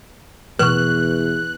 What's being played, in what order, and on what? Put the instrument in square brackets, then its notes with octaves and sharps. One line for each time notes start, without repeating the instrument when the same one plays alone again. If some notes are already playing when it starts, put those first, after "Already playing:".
[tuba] E2 [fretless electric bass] B2 E3 A3 [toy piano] B4 C#6 [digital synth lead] F#6